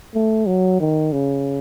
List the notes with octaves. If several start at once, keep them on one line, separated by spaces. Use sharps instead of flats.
A3
F#3
D#3
C#3